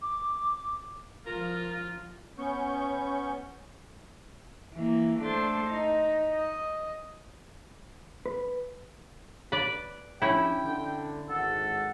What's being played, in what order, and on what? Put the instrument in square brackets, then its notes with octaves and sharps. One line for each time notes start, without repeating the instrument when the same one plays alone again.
[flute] D6
[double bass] F3 [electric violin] F4 [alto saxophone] A#4
[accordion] B3 C#4 C#6 G6
[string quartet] E3 A#3
A3 D4 A4 C5 C6 A6
D#4
D#5
[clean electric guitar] B4
[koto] B4 D5
[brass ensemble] F3 D4 G4 [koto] C#4 E4 [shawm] G5
[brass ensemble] D3
[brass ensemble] G#1 F#5 [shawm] A4